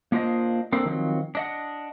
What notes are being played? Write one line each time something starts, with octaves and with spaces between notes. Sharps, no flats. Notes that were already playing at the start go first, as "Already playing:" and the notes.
A#3 D4 F4 C5 D#5
A#3 C4 D4 A4 C5
D#3 F3 F#3 C4
D4 D#5 F#5